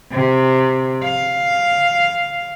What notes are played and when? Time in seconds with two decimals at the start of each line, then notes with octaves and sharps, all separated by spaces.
0.12 C3
1.04 F5